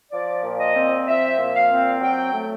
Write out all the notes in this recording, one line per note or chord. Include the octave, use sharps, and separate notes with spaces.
F3 D5
A#2
D#5
C4
F3 E5
A#2
F5
C4
F#3 G5
A3